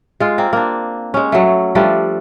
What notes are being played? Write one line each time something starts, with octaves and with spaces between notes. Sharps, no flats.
G#3 F4
A#3 C4
A#3 D4
G#3 C#4
F#3 A3
F3 G3 A3 D4